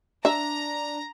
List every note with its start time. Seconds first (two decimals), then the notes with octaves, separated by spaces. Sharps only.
0.25 D4 E5 A#5